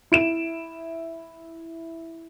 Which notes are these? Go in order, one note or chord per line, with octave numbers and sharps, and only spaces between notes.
E4 D7 E7